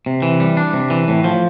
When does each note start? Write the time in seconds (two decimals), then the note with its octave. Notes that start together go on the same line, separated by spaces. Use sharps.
0.06 C3
0.22 E3
0.40 G3
0.57 D4
0.73 C3
0.90 E3
1.08 A2
1.24 F3